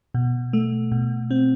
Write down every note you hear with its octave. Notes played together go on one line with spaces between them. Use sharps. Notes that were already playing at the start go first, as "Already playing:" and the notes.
B2
A3
B2
C4